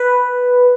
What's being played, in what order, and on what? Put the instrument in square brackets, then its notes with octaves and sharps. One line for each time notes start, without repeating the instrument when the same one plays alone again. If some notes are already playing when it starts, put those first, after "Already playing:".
Already playing: [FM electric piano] B4